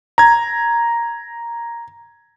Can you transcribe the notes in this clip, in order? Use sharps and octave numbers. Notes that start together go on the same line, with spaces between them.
A#5 G#6